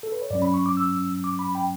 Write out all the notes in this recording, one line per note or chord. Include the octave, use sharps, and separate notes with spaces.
A4
B4
C#5
G2 F#3 C#4 D5
B5
C#6
D6
E6
D6
B5
G5